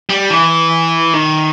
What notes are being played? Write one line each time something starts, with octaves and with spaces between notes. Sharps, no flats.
G3
E3
D#3